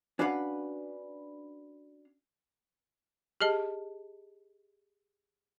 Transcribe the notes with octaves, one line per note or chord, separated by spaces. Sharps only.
C#4 D4 F#4 B4 F5 F#5
G4 G#4 D#5 A5